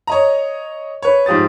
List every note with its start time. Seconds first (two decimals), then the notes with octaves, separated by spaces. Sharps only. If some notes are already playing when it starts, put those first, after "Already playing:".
0.07 C#5 D#5 A#5
1.02 B4 C#5
1.26 G#2 F3 G4 D#6 A6